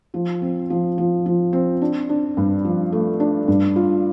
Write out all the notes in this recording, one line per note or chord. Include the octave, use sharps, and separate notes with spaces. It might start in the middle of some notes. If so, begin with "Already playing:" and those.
F3
C4
F3
F3
F3
C4
D4
D4
G2
F3
A3
D4
G2
F4